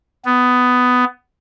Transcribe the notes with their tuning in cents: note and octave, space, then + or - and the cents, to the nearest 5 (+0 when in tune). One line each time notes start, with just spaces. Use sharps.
B3 +15